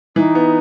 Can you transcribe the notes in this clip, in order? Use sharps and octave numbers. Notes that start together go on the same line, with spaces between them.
E3 D#4
B3